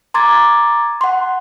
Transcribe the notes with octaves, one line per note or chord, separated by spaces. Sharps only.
A#5 C6 D6 G#6 A6
F#5 C6